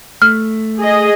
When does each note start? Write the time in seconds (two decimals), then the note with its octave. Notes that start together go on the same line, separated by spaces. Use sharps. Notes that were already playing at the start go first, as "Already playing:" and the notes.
0.22 A3 F6
0.78 G#4 D#5